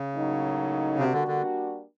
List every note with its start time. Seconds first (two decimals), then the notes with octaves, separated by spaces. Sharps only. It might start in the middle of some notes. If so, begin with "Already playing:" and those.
Already playing: C#3
0.15 A2 F#3 A#3 D#4
0.99 C3 G3 A#3 D4 F#4
1.13 D3
1.28 D3